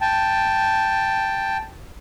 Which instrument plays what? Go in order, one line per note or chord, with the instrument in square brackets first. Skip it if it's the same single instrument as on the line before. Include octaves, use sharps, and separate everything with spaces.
[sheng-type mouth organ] G5 A5